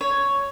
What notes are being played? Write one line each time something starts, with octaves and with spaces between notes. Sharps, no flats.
C#5